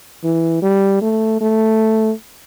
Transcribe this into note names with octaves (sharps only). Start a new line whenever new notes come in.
E3
G3
A3
A3